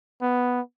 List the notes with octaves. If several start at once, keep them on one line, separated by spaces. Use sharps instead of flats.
B3